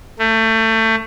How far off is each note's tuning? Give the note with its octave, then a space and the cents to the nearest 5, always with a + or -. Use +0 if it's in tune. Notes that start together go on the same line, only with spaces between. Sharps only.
A3 +25